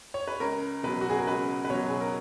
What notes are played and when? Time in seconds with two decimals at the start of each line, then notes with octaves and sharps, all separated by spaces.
0.14 C#5
0.27 B4
0.40 C#2 A#4
0.83 B2 F#3 B4
1.01 F#4
1.10 G#4
1.18 A#4
1.27 C#2 B4
1.65 B4
1.69 B2 F#3 C#5
1.88 G#4
2.01 A#4